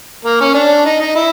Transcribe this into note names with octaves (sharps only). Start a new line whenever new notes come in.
A#3
C#4
D4
D#4
D#4
E4